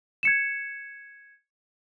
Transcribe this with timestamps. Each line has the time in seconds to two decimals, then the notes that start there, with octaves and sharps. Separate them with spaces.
0.23 G#6 C#7 E7